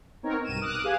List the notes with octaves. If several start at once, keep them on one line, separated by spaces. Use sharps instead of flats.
B3 C4 D#4 A#4 C#5
B1 G2 D#7 E7
D6 D#6 F6 F#6
G4 G#4 B4 F5 F#5 G#5